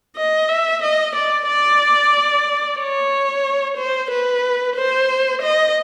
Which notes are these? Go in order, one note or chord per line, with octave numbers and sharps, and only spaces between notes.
D#5
E5
D#5
D5
D5
C#5
C5
B4
C5
D#5